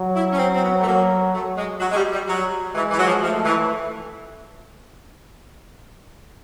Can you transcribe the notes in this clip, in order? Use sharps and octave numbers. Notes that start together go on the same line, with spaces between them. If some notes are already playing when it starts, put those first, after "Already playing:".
Already playing: F#3
E4
C#4
C4
C4
B3
A3
F#3 A#3
A3
G#3
F#3
G#3
G3
G3
F#3
E3 G#3
E3
F#3
F3
F3 A3
E3